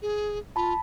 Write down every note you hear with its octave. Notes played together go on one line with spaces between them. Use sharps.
G#4
F4 A5 B5